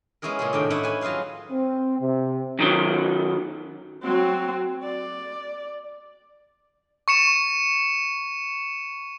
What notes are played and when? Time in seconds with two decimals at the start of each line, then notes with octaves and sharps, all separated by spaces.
0.22 G#3 B3 C#4 E4 G#4 A#4
0.39 A#2 C#3 G#4
0.53 A2 C3 D#3 D4 G5
0.70 C#4 D#4 E4 E5 F#5
0.83 B4 G#5
1.01 F#3 F4 G#4 F5 G#5
1.49 C4
1.99 C3
2.59 F#2 D#3 F#3
4.03 F#3 C4
4.83 D5
7.08 C#6 C#7 E7